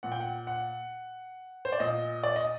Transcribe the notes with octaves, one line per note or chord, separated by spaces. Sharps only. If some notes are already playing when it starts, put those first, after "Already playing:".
A#2 F#5
G5
F#5
F#5
C5
D5
A#2 D#5
D5
D#5